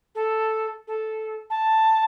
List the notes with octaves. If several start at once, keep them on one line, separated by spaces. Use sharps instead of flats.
A4
A4
A5